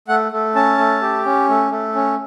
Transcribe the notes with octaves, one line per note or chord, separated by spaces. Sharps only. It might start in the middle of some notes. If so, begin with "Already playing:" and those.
A3 F#5
A3
C#4 A5
A3
G4
C#4
A3
A3
C#4